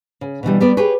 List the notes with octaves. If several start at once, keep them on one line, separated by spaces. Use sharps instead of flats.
C#3
B2 D3 E3 G3
G3 B3 A#4 D5
G4 G#4 B4 C#5